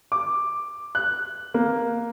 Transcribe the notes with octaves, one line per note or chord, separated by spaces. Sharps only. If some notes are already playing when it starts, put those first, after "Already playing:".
D6
F#6
A#3